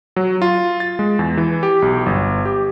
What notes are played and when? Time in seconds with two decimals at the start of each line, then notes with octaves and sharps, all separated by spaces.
0.16 F#3
0.42 F4
0.80 A6
0.99 G#3
1.19 E2
1.37 E3
1.63 G4
1.82 B1
2.06 G1
2.45 G4